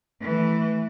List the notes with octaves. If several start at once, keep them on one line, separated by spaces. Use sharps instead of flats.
E3 A3